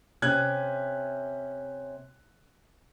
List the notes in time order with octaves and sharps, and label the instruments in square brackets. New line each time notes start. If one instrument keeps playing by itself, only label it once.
[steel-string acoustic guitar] C3 C#4 [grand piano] F#6 G#6